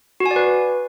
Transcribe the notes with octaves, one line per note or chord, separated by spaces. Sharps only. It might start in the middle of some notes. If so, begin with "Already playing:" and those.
F#4
G#5
D5
B4